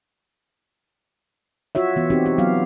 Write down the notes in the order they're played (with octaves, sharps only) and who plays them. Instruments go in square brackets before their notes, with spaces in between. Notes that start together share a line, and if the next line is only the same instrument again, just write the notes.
[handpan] F4 F#4 C#5 E5
E3 B3
C4 D#4 F#4 G4
G4
F#3 B3 F4 F5